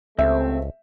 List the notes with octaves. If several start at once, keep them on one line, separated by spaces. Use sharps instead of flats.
C#2 C3 A3 C4 E5